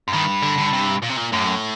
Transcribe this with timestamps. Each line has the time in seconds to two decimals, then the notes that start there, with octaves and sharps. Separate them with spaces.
0.08 F#2
0.13 G2 D#3
0.43 D3
0.58 D3
0.73 C3
1.03 A#2
1.10 C3
1.17 A#2
1.33 F#2 A2